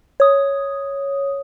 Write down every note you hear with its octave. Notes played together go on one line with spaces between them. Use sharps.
C#5 D#6